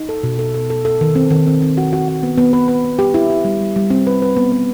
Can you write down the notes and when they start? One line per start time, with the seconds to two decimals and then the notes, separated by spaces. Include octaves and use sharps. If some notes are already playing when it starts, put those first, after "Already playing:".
Already playing: D#4
0.09 A4
0.23 B2
0.39 A4
0.54 A4
0.70 A4
0.85 A4
1.01 D#3
1.16 C4
1.30 D#3
1.47 C4
1.62 C4
1.77 F#4
1.93 F#4
2.08 F#4
2.23 B3
2.37 B3
2.53 B4
2.68 B4
2.85 B3
2.99 G4
3.14 E4
3.30 G4
3.45 G3
3.61 G3
3.76 G3
3.90 C4
4.07 B4
4.22 B4
4.37 B3
4.52 B3